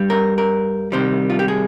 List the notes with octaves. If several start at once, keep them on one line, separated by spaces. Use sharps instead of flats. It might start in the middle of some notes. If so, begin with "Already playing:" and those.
Already playing: G2 G3
A#4
A#4
C2 C3 D#3 G3 C5
F4
G4
G#4